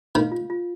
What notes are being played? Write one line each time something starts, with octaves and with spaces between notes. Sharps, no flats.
D#3 F5
F4
F4